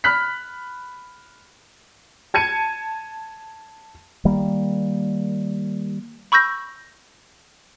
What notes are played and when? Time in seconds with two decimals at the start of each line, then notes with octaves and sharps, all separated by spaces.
0.04 B5 F6 F#6 B6
2.34 A5 G#6 C#7 D#7
4.25 D#3 G3 A#3
6.32 B5 C#6 E6 G6 A#6